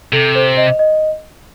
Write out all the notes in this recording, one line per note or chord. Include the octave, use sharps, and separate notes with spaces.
C3 A4
C5
D#5
D#5